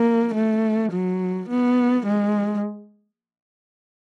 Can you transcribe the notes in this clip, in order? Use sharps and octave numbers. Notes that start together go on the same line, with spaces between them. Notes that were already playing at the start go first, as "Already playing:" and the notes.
Already playing: A#3
A3
F#3
B3
G#3